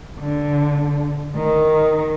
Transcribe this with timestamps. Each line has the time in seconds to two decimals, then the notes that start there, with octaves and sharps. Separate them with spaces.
0.20 D3
1.37 D#3